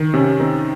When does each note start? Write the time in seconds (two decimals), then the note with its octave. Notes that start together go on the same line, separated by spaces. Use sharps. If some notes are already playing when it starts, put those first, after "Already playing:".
Already playing: D#3
0.14 C3 C#4
0.40 D#3 C4 D#4